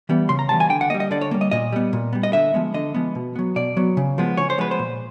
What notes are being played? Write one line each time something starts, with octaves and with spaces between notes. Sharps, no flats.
E3 G3 B3
C#3 C6
A#5
E3 G3 B3 A5
G#5
D3 G5
F#5
G3 A#3 D#5
D#5
D3 D5
C#5
G3 A#3
D#5
A#2 D#5
G3 B3
A#2
G3 B3
D#5
D3 E5
F3 G#3 B3
D3 D#5
F3 G#3 B3
B2
F#3 B3
B2 D5
F#3 B3
C#3
F3 G#3 B3
C#3 C#5
C5
F3 G#3 B3 B4
C5
A#2